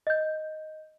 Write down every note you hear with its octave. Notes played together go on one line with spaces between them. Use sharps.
D#5 G6